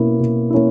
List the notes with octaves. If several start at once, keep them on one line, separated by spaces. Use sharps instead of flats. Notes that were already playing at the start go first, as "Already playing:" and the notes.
Already playing: B2 A#3 C#4 E4
B2
A#3 C#4 E4